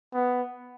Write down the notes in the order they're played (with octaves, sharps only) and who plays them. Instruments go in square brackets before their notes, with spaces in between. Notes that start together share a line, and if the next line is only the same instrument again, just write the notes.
[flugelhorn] B3